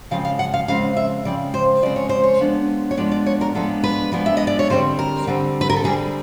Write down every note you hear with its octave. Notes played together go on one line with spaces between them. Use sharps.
C#3 F3 G#3 C4 F5
F5
F#5
F5
C#3 F3 G#3 C4 F5
E5
C#3 F3 G#3 C4 D5
C5
C#3 F3 G#3 C4 D5
C#5
C5
C#5
F3 G#3 B3 D4
C#5
F3 G#3 B3 D4 D5
D5
C#5
A#4
F3 G#3 B3 D4 A4
B4
F3 G#3 B3 D4
E5
D#5
D5
C#5
D3 G3 C4 C5
A#4
D3 G3 C4
B4
A#4
A4
D3 G3 C4 G#4